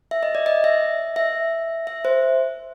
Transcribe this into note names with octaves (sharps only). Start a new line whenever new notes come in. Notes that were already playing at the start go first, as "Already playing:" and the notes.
E5
D#5
D5
D#5
E5
E5
E5
C5